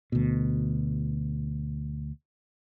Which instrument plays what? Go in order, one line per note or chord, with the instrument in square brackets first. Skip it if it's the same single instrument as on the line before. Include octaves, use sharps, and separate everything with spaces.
[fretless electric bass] D2 B2